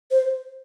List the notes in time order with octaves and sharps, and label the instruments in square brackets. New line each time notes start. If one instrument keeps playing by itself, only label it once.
[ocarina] C5